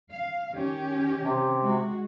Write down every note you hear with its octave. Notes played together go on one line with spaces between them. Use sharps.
F5
D#3 C#4 G4
C3
G#3 F#4